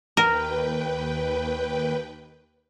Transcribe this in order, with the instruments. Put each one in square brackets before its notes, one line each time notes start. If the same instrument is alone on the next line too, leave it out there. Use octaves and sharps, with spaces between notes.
[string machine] D#2 B4 G5 [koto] A#4